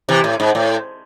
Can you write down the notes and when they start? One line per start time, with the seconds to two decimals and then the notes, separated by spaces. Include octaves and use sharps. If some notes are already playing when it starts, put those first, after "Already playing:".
0.09 C3 E3
0.24 A2
0.40 G#2
0.55 A2